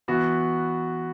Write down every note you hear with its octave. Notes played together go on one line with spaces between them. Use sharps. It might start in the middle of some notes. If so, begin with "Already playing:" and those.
E3 B3 F#4